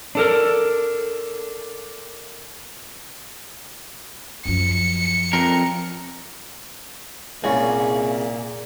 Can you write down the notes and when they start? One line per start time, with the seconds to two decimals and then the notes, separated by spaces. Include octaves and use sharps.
0.15 D4 A4 A#4
4.45 F#2 F3 C#7
5.33 F2 A#4
7.44 C2 A#2 C#3 G#4